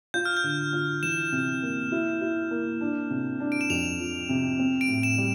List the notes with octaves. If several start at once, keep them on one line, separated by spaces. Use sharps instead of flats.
F4 G6
F6
G6
D3
F4
E3 E7
C3
A#3
E4
E4
A#3
D4
C3
D4
D7
E7
F2 F7
F3
C3
C4
D7
A2
E7
G3